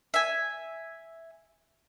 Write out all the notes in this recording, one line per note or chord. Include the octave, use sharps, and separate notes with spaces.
E5 G#5